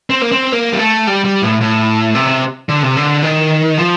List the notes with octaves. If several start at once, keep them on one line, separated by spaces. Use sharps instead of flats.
C4
A#3
C4
A#3
G3
A3
G3
G3
A2
A2
C3
D3
C3
D3
D#3
F3